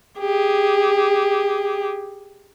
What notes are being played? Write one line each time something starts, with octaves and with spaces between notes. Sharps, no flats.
G4 G#4